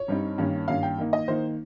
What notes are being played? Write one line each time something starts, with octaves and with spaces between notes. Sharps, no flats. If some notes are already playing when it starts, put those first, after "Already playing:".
Already playing: C#5
G2 G3 C4 D#4
G2 D#3 A#3 C#4
G2 D#3 A#3 C#4 F5
G5
D#3 A#3 D#4
D#5
D#3 A#3 D#4 C5